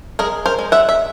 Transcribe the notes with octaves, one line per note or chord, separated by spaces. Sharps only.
G#3 G#4 A#4
A#4 C5
G#3
E5 F#5
E5